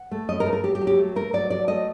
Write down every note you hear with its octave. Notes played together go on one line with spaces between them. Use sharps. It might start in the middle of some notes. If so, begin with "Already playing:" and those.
Already playing: F#5
A3
F#2 D#5
A#4
A3
A#4
F#3 G4
G4
F#3
G4
A3
A3 A#4
F#3 D5
F#3 D5
A3 D#5